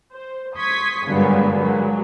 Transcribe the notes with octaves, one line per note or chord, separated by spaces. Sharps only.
C5
C6 C#6 D#6 G#6 B6
G2 A#2 D3 F#3 G#3 B3
A#2 F#3 G#3